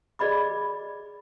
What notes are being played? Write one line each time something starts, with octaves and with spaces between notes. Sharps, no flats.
G#4 D5 D#5 B5 D6